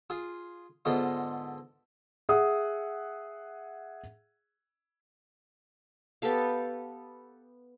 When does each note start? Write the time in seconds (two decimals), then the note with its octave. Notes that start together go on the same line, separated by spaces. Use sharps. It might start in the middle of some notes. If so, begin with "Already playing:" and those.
0.10 F4 G#4
0.85 G#2 D3 B3 F4 D#5
2.29 G#4 E5 F#5 D#6
6.22 B3 G4 A4 F5